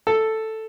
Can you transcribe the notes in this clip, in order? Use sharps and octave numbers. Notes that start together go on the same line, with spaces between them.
A4